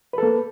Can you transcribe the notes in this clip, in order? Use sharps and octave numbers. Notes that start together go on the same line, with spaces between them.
A#3 A4 B4